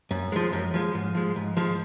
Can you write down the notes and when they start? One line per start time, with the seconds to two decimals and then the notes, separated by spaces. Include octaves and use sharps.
0.11 F#2
0.32 F3 G#3
0.53 F#2
0.74 F3 G#3
0.95 G#2
1.15 F3 G#3
1.36 G#2
1.57 F3 G#3